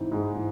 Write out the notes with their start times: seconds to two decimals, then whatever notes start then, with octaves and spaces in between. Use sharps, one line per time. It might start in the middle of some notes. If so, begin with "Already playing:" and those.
Already playing: G#2 E3 C4 D#4
0.11 G#2
0.36 E3